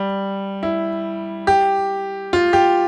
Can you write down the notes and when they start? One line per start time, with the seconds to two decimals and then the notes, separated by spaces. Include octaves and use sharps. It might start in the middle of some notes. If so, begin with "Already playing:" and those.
Already playing: G3
0.63 E4
1.47 G4
2.33 F4
2.53 G4